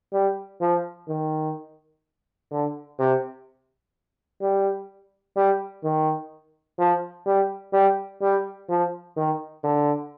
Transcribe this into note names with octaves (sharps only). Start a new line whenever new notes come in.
G3
F3
D#3
D3
C3
G3
G3
D#3
F3
G3
G3
G3
F3
D#3
D3